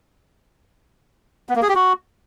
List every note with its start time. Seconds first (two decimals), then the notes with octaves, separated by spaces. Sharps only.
1.49 B3
1.56 A#3
1.62 G#4
1.69 G4
1.75 F#4